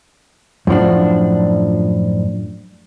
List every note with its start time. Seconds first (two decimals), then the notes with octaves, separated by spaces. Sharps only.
0.67 F#2 A2 F3 D4